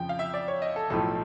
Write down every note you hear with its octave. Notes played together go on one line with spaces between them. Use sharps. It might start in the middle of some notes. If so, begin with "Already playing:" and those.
Already playing: F2 C#3 F3 G5
F5
E5
D5
C#5
D#5
A4
B1 A2 F3 A4